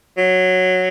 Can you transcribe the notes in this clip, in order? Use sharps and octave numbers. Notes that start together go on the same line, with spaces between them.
F#3